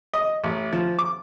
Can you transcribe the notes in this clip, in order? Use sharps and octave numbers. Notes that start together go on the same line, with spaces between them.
D#5
A1
F3
D6